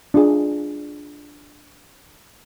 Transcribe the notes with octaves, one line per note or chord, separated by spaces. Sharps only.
D4 F4 G#4